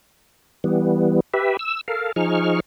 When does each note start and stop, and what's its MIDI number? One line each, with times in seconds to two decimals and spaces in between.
0.64 1.20 52
0.64 1.20 55
0.64 1.20 59
1.34 1.57 67
1.34 1.57 71
1.34 1.57 76
1.59 1.81 88
1.88 2.12 69
1.88 2.12 70
1.88 2.12 77
2.16 2.60 53
2.16 2.60 63
2.16 2.60 68
2.16 2.60 85
2.16 2.60 89